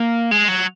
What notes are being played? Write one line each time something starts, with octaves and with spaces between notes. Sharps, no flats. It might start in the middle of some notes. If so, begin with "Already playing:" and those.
Already playing: A#3
G#3
F#3